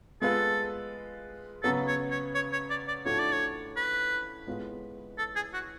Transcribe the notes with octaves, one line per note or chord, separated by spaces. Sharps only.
G#3 B3 F4 A4 B4
C#3 F#3 B3 A4
C#5
C#5
C#5
C#5
D5
D5
A2 F3 A3 D4 F#4 C#5
D5
C#5
B4
A2 G#3 B3 F4
A4
G#4
F#4